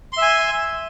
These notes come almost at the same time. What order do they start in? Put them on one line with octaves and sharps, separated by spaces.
C6 E5 G#5